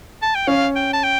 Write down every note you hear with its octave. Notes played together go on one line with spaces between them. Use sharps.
A5
G5
C#4 F5
G5
A5
G5